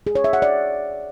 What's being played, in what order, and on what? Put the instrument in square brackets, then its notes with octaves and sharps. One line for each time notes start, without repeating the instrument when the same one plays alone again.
[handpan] G#4
C#5
E5
F#5
D5